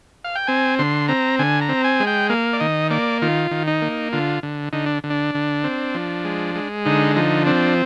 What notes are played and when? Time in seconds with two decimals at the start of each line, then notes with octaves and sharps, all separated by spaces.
0.24 F5
0.35 G5
0.47 C4 G#5
0.79 D3 C6
1.08 C4 A#5
1.39 D3 G#5
1.61 A#5
1.69 C4
1.84 G#5
2.00 G#3
2.07 G5
2.30 A#3 F5
2.53 D5
2.60 D#3 D#5
2.90 A#3 D5
3.22 D#3 F4
3.51 D#3
3.67 D#4
3.82 A#3
4.13 D3 F4
4.43 D3
4.73 D3 D#4
4.86 D4
5.04 D3
5.10 D4
5.35 D3
5.64 C4
5.95 F3
6.25 G#3
6.55 G#3
6.85 D3 D#4
7.16 F3 D#4
7.46 C4 D4